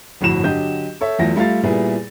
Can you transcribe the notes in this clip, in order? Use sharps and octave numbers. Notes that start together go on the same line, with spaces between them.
G1 F2 A2 F#4 E7
D3 F#3 G4 D#5 G6
A4 C#5 E5
E2 E3 F#3 A3 F4 A#6
G3 A3 F4 F5 A6
A#2 G3 B3 E4 G#4